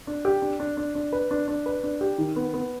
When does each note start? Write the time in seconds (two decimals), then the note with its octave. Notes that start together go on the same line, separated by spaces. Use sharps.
0.07 D4
0.25 G4
0.42 D4
0.60 D4
0.77 D4
0.95 D4
1.13 B4
1.31 D4
1.48 D4
1.66 B4
1.83 D4
2.01 G4
2.18 D#3
2.36 B3
2.54 B3